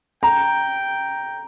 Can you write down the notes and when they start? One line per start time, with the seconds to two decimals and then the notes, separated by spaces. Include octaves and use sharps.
0.23 G5 A#5